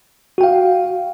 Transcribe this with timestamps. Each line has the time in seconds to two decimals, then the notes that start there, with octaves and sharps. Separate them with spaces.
0.38 F#4
0.41 G5
0.43 F5